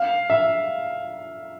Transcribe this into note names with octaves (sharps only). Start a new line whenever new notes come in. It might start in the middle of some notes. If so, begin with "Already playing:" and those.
Already playing: F5
E5